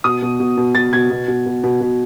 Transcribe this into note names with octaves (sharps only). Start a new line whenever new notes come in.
B2 D#6
B2
B2
B2
B2 A6
B2 G#6
B2
B2
B2
B2
B2